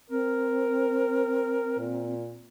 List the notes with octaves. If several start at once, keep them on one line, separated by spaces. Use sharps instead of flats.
C4 A#4
A#2